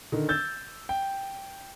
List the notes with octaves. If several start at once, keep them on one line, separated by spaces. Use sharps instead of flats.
D3 D#3
E6 G6 A6
G5